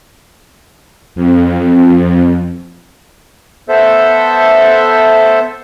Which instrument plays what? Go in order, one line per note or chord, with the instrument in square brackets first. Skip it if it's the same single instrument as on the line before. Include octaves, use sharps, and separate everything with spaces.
[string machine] F2
[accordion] B3 A4 C5 E5